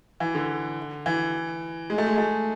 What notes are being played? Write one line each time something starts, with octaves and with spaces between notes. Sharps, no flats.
E3
D3
E3
G#3
A3
G#3
A3